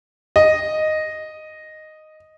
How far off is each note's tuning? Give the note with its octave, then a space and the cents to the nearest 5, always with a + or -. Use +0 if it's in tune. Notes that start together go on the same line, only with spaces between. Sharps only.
D#5 -5